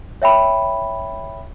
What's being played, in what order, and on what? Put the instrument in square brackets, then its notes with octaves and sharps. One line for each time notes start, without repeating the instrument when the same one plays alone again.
[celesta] C#5 E5 G5 B5